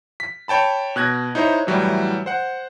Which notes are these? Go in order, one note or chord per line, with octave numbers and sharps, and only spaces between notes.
B6
C#5 G5 A5 B5
B2 F#6 G#6 A#6
D#4 E4 C5 C#5
A2 E3 F#3 G3
C5 F#5